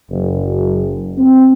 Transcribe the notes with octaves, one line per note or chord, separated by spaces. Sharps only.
F#1
C4